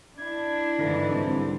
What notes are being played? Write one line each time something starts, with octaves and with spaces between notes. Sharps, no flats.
D4 E4 G#6
G#2 D3 E3
C2 C4